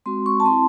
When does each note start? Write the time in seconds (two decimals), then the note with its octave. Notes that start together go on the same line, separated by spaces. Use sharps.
0.06 G#3 C4 F#4 C6
0.26 C#6
0.40 A5
0.45 C4 E4 C6